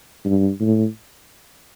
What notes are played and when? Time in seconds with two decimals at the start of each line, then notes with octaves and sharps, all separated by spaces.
0.25 G2
0.61 A2